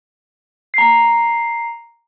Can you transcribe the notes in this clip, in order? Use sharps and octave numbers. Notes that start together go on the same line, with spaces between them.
A#5 C7